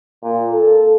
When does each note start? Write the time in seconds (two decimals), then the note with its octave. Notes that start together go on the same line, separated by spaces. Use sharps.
0.23 A#2
0.52 A4